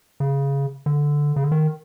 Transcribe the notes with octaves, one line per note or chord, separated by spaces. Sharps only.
C#3
D3
C#3
D3
D#3